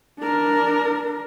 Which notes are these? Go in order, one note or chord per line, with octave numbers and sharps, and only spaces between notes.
D4 A#4